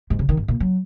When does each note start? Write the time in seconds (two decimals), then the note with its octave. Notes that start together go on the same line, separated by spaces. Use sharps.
0.10 G#2
0.19 C#3
0.29 D#3
0.37 G#2
0.48 A#2
0.60 F#3